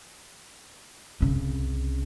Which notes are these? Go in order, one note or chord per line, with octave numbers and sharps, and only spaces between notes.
C2 C#3